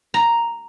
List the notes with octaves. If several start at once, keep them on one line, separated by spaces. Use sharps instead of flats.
A#5